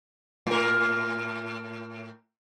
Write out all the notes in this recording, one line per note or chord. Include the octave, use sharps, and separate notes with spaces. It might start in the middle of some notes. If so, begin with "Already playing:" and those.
A2 A#4